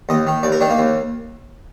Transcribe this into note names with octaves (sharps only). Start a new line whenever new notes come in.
D#2 D#5
D#3
D#2 D5
A#4
D#3 D4
A#3
D#2